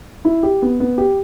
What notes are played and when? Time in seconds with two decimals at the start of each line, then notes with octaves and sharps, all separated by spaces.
0.25 E4
0.43 G4
0.62 B3
0.80 B3
0.98 G4